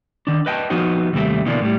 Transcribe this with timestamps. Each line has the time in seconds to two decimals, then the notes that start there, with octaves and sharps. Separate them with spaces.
0.27 D#3 D4
0.46 B4 D#5 G5 A5
0.70 F3 B3 D#4 F#4 C5
1.13 D#2 C3 G3 A3 C4
1.46 B2 D3 E3 A#3 D4
1.62 A2 G3